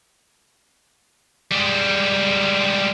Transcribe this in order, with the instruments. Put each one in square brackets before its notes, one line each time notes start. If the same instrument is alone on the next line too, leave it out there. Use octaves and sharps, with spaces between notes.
[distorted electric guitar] G3 G#3